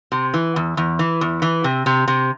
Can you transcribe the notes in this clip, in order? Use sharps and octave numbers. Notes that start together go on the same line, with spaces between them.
C3
E3
E2
E2
E3
E2
E3
C3
C3
C3